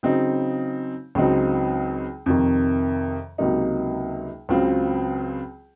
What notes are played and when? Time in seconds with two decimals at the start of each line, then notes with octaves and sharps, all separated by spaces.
0.03 C#3 F#3 C4 D#4
1.15 C#2 C#3 F#3 C4 D#4
2.26 F2 C3 D#3
3.38 C#2 C3 F#3 A#3 D#4
4.49 C#2 C#3 F#3 C4 F4